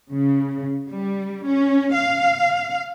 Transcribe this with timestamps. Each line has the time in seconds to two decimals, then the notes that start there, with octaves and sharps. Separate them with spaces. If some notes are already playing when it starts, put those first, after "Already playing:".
0.11 C#3
0.89 G3
1.46 C#4
1.94 F5